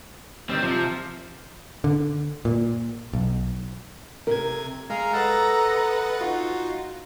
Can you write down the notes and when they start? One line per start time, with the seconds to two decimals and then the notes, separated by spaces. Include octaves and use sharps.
0.49 D#3 G3 C4
0.63 C3 F3
1.84 D3
2.45 A#2
3.13 B1
4.27 C3 A#4 G#6
4.90 G#3 G#4 F5 A#5
5.13 A4 B4 D#5 F#5
6.21 D#4 F4 F#4